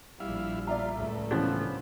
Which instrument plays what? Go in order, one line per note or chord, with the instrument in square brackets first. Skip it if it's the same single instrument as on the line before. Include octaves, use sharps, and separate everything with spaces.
[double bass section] A#1 G3 [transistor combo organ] E4 F5
[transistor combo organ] F4 [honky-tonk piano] D5 E5 A#5
[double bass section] C#2 [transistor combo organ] A2
[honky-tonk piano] C#3 E3 [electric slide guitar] F3 B3 D4